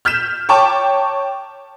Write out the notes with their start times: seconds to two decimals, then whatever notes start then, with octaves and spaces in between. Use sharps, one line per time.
0.05 F6 G6 B6 E7
0.49 C#5 G5 A5 C#6 D6